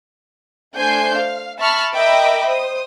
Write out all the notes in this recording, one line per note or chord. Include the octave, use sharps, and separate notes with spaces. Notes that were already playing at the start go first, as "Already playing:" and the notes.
A3 D4 C5 G#5 G6 C7
F5
E5 A5 B5 C#6 F6
A#4 D#5 E5 G5 B5 D6
C5 D#6